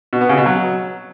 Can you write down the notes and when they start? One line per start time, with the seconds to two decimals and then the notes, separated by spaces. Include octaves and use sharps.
0.13 B2
0.21 B3
0.29 C#3
0.38 B2
0.46 F#3